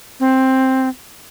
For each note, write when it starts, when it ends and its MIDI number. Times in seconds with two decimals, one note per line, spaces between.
0.20 0.89 60